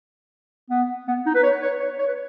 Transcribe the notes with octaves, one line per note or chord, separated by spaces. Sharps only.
B3
B3
D#4
B4
C#5
C#5
C#5
C#5
B4